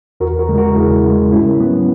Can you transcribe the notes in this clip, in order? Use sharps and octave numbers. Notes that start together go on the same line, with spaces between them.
E2 F#4 A#4
F#4 A#4
C#3 G#3
F#4 A#4
E2 E4 G#4
C#3 G#3
G#2 C#4 E4
F#3 B3